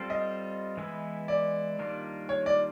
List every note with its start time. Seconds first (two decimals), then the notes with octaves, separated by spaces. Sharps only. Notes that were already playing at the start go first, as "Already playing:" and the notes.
Already playing: G3 C4 F4 A4
0.10 D#5
0.77 E3 G#3 B3 E4
1.28 D5
1.79 D#3 G3 A#3 D4 F4
2.29 C#5
2.46 D5